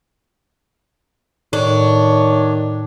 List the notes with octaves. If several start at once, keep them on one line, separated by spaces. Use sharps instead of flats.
A2 D#3 D4 C#5